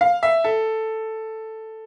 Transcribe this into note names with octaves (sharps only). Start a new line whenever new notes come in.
F5
E5
A4